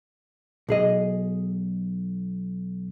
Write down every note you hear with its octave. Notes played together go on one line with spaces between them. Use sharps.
B1 G#4 D#5